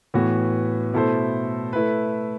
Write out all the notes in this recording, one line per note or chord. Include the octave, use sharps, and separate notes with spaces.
A2 E3 B3 F#4
B2 A3 E4 A4 C5
A3 E4 B4